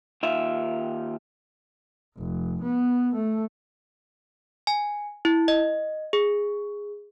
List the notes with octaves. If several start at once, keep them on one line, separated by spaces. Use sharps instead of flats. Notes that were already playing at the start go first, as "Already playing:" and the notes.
D#2 D#3 F4 E5
F1
B3
A3
G#5
E4
D#5
G#4